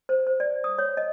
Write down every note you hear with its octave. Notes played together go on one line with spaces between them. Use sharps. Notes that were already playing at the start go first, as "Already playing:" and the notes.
C5
C5
D5
D#6
C#5
D#5